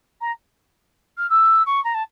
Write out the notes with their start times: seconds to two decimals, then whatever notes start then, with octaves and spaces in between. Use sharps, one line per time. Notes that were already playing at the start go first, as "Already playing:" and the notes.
0.21 A#5
1.18 F6
1.30 E6
1.66 C#6
1.84 A#5
1.94 A5